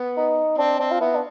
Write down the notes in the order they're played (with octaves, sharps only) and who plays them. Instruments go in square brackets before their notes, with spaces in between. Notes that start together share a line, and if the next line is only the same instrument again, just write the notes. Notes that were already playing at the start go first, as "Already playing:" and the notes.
Already playing: [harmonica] B3
[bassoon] D#4
[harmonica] C4 [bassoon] D4
[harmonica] C4 [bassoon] D4
[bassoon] F4
[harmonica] B3 [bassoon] E4
[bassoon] D4